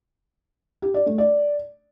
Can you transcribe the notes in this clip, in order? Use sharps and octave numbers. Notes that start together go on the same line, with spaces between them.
G4
D5
A3
D5